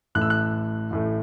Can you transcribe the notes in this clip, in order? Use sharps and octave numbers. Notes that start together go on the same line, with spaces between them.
A1 A2 A3 F#6
E6
F#6
A1 A2 A3